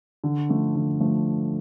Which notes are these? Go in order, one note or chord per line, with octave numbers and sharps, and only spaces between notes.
D3
F3 A3
D3
F3 A3